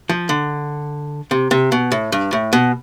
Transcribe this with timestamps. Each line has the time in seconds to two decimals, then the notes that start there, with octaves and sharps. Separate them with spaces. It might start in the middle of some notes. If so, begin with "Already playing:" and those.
0.09 F3
0.29 D3
1.31 C3
1.51 C3
1.72 B2
1.92 A2
2.12 G2
2.33 A2
2.53 B2